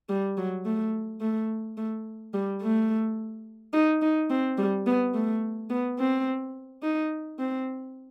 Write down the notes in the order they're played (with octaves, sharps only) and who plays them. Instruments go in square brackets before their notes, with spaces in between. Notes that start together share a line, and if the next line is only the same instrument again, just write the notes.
[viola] G3
F#3
A3
A3
A3
G3
A3
D#4
D#4
C4
G3
B3
A3
B3
C4
D#4
C4